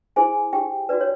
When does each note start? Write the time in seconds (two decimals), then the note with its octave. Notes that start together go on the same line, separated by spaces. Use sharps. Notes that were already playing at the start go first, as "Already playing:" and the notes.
0.16 E4 G#4 C5 G#5
0.53 G4 G5
0.89 F#4 B4 D5
1.01 C#5